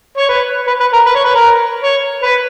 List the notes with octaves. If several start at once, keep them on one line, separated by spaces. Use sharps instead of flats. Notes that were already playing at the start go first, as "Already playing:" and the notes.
C#5
B4
B4
B4
A#4
B4
C#5
B4
A#4
C#5
B4